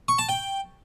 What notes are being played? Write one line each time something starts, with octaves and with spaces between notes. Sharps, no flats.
C#6
A5
G5